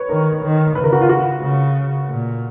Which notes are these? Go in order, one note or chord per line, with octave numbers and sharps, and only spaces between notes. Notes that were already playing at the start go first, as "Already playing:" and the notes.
Already playing: B4 C#5
D#3 A#4
D#3
C#3 B4
A#4
F#4
F4
F#4
C#3
A#2